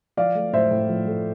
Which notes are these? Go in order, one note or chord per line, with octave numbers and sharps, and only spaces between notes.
F3 D5 F5
A3
A2 C5 E5
A2
F3
A3